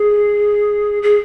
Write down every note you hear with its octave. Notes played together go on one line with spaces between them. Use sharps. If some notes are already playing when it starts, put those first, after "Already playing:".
Already playing: G#4
G#4